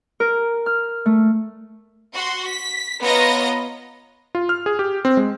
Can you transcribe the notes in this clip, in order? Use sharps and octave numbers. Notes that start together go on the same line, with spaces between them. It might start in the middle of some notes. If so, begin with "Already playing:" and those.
A#4
F6
A3
F#4 C6
B6
B3 F4 C#5 D#5 A#5 A#6
F4
F6
G#4
G4
C4
G#3